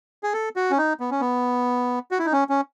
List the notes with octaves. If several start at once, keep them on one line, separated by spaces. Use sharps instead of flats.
G#4
A4
F#4
C#4
D#4
B3
C#4
B3
F#4
E4
D#4
C#4
C#4